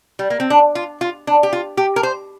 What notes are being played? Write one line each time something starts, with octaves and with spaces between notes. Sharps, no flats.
G3
A#3
C4
D4
F4
F4
D4
G4
F4
G4
A#4
C5